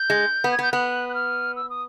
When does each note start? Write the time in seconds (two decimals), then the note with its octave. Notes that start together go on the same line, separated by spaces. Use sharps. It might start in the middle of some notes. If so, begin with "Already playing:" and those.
Already playing: G6
0.10 G#3
0.44 B3
0.51 G#6
0.59 B3 G6
0.72 B3 F#6
1.09 F#6
1.14 F6
1.56 E6
1.70 D#6